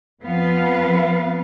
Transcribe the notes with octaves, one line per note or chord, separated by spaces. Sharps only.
F2 F3 B3 C4 B4 F5